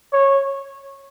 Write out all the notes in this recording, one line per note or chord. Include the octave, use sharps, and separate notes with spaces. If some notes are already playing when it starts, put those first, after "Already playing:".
C#5